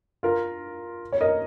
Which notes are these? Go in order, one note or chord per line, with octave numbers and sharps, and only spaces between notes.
F4 A#4
C#5
A#4 D#5